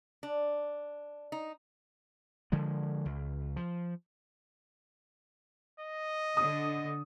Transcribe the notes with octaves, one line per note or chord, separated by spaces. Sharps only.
D4
D#4
D3 F3 G#3
C#2
F3
D#5
D3 D#6